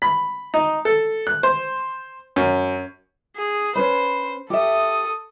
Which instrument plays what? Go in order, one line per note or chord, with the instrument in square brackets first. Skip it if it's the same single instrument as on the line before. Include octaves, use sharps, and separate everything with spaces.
[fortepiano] B5
D#4
A4
F#6
C5
F#2
[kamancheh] G#4
[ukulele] C#4 B4 B5 [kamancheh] C5
[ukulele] G4 E5 [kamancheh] A4 D#6